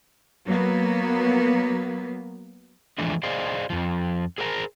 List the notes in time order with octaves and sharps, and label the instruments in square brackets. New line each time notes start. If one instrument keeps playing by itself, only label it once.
[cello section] F#3 A#3 B3
[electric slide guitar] D3 E3 F3 G#3 A3 D4
G#4 C5 D5 D#5 F5
F2 F3
G#4 A#4 C5 F5 A#5